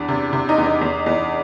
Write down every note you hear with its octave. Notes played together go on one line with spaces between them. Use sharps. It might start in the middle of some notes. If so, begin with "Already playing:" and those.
Already playing: E2 D4
C3
C3
D#4
E2
D#4
E2
E2